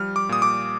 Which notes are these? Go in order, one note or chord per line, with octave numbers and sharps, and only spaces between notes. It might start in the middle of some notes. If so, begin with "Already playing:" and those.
Already playing: F3 G3 F6
D6
A#2 D#6
D6